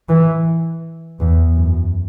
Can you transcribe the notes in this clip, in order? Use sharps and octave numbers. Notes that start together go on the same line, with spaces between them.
E3
E2
F#2